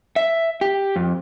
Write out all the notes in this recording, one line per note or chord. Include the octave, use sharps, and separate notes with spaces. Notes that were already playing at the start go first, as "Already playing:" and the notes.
E5
G4
F2